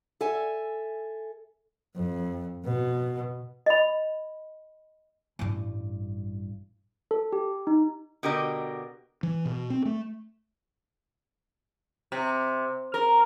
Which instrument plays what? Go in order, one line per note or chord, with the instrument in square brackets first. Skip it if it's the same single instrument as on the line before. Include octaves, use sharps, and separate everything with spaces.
[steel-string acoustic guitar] A4 E5 G#5
[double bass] F2
B2
[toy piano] D#5 B5
[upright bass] A1 G2
[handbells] A4
G4
D#4
[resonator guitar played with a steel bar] B2 D3 G4 A#4 D#5
[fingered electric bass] E3
B2
C4
A3
[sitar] C3
A#4